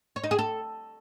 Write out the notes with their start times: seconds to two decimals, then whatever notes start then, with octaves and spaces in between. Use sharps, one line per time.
0.16 C#5
0.24 D#4
0.31 G#4
0.39 A4